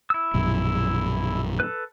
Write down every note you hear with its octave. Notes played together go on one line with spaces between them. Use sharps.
E4 E6
A#1 F#2 B2
A4 B4